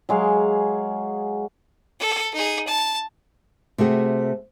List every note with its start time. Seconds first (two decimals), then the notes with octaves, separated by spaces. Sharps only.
0.09 F#3 G#3 G#4 F5
2.00 A4
2.34 D#4 G#4
2.67 A5
3.78 C3 A3 F#4 G#4